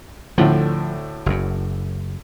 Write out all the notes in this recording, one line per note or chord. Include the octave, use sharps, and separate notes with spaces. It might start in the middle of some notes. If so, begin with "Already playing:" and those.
D2 A2 D3 F3
F#1 F#2